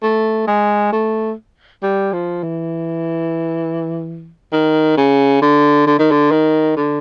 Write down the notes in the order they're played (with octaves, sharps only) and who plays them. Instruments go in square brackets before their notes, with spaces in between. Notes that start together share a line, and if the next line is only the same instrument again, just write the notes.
[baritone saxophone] A3
G#3
A3
G3
F3
E3
D#3
C#3
D3
D3
D#3
D3
D#3
D3